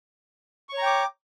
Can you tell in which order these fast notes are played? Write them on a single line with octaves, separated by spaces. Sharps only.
C#6 C#5 A#5 G5 D6